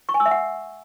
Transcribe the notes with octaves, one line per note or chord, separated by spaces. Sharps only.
C#6
G#5
E6
E5
F#5